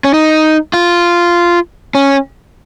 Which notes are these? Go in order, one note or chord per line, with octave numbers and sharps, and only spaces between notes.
C#4
D#4
F4
C#4